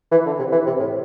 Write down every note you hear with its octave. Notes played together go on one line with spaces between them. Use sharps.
E3
D3
C3
E3
C3
A2